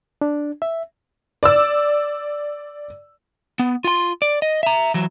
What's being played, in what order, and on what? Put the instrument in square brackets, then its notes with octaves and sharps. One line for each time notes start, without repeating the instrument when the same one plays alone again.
[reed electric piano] D4
E5
[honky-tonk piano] D5 D6 E6
[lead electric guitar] B3
F4 C6
D5
D#5
E5 A#5
E3 F#3